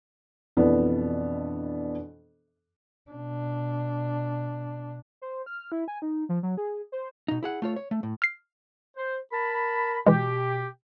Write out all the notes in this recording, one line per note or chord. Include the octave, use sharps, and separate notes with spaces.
F2 B2 E3 B3 D4
B2 D4
C5
F6
E4
G#5
D#4
F3
F#3
G#4
C5
B2 D#4
E4 G#4 F#5
A3 F4 C#5
C#5
A3
A2
F6 C7
C5
A#4 A5 B5
B2 E3 G#3 G4